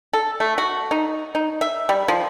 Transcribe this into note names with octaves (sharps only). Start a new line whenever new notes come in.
A4
A3
F#4
D#4
D#4
E5
G3
F3